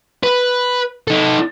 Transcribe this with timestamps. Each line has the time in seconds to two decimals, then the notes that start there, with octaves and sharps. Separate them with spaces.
0.23 B4
1.08 D#4 A4